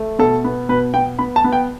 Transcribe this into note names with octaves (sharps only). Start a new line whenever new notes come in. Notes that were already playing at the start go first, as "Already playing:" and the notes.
Already playing: A3
B2 A4
B3
B2 B4
B3 G5
B3 B5
A5
B3
G5